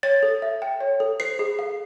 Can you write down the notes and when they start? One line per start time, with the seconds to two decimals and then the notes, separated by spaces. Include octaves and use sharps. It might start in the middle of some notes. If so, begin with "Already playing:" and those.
0.03 C#5 A6
0.23 A4
0.42 E5
0.62 G5
0.81 C#5
1.00 A4
1.20 C5 C7
1.39 G#4
1.59 F5